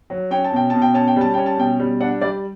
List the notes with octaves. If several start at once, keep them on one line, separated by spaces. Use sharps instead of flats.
F#3
C#4 G5
A5
B2 G5
B2 A5
G5
C#4 A5
G5
G3 A5
C#4 G5
A5
B2 G5
G3
D4 F#5
G3 D5